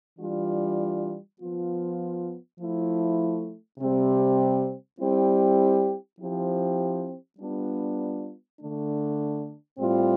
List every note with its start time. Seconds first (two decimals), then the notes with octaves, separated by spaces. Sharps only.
0.19 E3 G3 D4 F4
1.40 F3 B3 F4
2.59 F3 A3 E4
3.79 C3 G3 C4 G4
4.99 G3 C4 E4 G4
6.19 F3 C4 E4 G4
7.39 G3 B3 D4 F4
8.59 D3 A3 D4
9.79 A2 G3 C4 F4